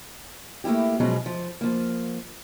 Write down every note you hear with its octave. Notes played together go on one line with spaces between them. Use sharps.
A3 A#3 C4 E4 G4
B2 F3 F#3 G#3 C#4
F3
F3 A#3